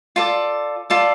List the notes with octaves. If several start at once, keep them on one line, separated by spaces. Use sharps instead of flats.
F4 A4 D5
F4 A4 D5